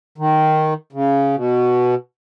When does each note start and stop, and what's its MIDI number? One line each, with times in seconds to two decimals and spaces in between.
0.18 0.74 51
0.93 1.35 49
1.35 1.95 47